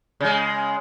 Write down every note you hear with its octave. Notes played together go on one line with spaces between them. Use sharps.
C#3 G#3